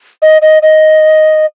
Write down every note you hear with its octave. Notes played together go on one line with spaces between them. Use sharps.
D#5
D#5
D#5